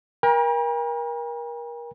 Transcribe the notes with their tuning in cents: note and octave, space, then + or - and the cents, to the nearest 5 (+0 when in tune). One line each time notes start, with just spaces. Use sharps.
A#4 +30 G5 +45 A#5 +45